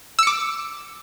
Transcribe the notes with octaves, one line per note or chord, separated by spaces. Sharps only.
D6 E6 C#7